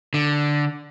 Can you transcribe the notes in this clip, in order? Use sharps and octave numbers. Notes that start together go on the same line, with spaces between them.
D3